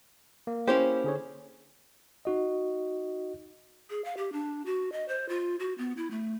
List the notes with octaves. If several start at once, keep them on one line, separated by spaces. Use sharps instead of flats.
A#3
C#4 E4 G4 C5
D3 G#4 C#5
D#4 F#4 D#5
G#4
F5
G4
D4
F#4
D#5
C5
F4
F#4
B3
E4
A3